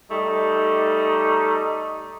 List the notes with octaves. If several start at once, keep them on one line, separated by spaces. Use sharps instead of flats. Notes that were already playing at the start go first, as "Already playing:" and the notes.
G3 A3 D#4